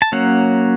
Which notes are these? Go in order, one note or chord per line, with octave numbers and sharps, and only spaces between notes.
A5
F#3 A#3 C#4 F#5